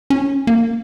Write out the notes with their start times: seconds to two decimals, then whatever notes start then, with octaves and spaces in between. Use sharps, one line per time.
0.10 C#4
0.47 A#3